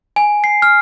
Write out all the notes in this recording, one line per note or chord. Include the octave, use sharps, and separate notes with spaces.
G#5
C7
F6